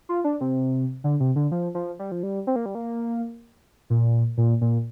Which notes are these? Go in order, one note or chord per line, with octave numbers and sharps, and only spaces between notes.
F4
D4
C3
D3
C3
D3
F3
F3
G3
F3
G3
C4
A#3
G3
A#3
A#2
A#2
A#2